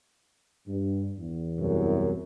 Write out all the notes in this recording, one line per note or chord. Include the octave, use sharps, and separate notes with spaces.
G2
E2
C2 F#2